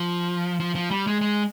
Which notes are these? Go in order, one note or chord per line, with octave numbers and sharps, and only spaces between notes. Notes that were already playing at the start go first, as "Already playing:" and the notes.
Already playing: F3
F3
F3
G3
G#3
G#3